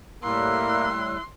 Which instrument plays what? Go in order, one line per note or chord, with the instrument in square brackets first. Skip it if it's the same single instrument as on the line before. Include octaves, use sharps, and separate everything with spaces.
[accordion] A2 G3 [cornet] A#3 [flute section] E4 E6 F#6 [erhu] C6